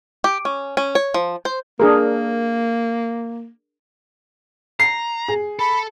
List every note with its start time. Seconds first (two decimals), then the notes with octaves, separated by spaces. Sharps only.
0.24 G4
0.45 C#4
0.77 C#4
0.95 C#5
1.14 F3
1.45 C5
1.80 A#3 D4 G#4 A#4
4.80 A#5 C7
5.28 G#4
5.59 A4 B5